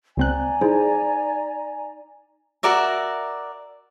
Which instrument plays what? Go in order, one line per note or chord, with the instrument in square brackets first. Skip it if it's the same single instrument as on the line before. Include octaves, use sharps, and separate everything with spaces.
[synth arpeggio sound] C#2 C4 F#6 [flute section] D5 G#5 A#5
[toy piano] D#4 [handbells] E4 G#4 C5
[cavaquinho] F#4 A#4 D5 E5